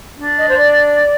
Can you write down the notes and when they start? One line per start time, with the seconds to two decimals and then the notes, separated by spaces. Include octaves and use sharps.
0.19 D4
0.38 D#5
0.49 C5
0.58 D5